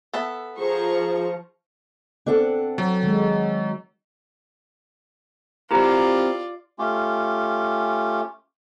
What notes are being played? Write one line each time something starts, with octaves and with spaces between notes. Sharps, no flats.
B3 A4 E5
F3 G#4 C5 A#5 C#6
C4 D4 A4 F#5
F#3
D#3 G#3
C4 E4 F4 G4 A#4 D5
A3 C#4 F4 G4